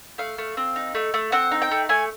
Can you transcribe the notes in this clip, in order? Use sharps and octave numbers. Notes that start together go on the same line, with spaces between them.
A3 F5
A3
C4
D#4
A3
A3
C4 F#5
D#4
G5
A3
A3 G#5